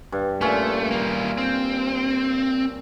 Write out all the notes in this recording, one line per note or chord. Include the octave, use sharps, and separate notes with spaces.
G2
A#2 A3 C#4 F4
G3 A#3
C4